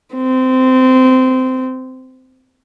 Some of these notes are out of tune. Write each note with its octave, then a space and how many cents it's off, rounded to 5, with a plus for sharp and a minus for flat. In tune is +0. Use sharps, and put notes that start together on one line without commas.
C4 -20